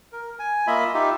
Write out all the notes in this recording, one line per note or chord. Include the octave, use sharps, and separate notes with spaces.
A#4
G#5
A#3 F4 D#5 E5 B5
D#4 F4 G4 E5